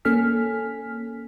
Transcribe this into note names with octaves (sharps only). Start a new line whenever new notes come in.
A#3 C#4 A4 G#5 F6 B6